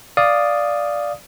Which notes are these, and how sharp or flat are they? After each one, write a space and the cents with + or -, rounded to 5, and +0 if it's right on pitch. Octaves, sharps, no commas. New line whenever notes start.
D5 +0 F5 +0 D#6 -5